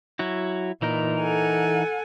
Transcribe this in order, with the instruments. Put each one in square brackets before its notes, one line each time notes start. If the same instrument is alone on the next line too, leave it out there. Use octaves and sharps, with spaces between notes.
[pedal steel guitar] F#3 E4 F#4
[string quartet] A#2 [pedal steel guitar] E3 D#4 A#4
[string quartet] A4 F#5 G#5